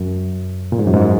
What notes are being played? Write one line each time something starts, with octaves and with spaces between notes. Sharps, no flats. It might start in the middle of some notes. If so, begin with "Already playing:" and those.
Already playing: F#2
A#2
G#2
F#2
G#2